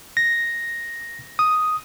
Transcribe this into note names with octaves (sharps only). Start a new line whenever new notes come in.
A#6
D#6